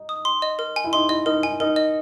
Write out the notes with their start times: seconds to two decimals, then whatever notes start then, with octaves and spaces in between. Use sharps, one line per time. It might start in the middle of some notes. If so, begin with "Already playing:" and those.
Already playing: D#4
0.09 D#6
0.25 C6
0.42 D#5
0.59 A#4
0.76 G#5
0.84 E4
0.93 D#4 C6
1.09 E4 D#5
1.26 D#4 A#4
1.43 D#4 G#5
1.60 D#4 A#4
1.76 D#5